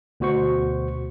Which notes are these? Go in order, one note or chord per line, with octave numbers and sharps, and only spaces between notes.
D2 B2 F#4 C5 C#6